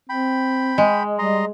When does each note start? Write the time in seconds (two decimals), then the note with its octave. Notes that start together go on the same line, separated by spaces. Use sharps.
0.09 C4 G5 B5
0.78 G#3
1.19 G3 D#5 A#5 C6